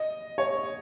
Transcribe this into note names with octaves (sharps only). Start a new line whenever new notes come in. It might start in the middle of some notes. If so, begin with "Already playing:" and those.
Already playing: D#5
C#5